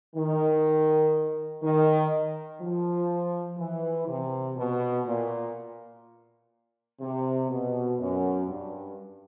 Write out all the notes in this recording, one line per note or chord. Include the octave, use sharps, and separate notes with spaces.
D#3
D#3
F3
E3
C3
B2
A#2
C3
B2
F#2
G2